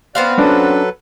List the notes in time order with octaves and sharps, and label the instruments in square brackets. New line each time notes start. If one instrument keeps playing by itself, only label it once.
[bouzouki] B3 C4 F5 [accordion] D5 F#6
[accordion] F#3 A4 B4 [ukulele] C#4 D4